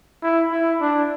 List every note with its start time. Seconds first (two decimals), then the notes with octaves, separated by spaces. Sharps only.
0.23 E4
0.52 E4
0.81 D4